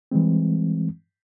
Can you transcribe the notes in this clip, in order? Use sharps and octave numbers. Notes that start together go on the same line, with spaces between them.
E3 G3 G#3 C4